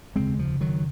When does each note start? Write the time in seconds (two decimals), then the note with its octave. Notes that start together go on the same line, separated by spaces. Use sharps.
0.15 F1 D#2 C#3 G#3 C4
0.39 F3
0.61 D#3 F#3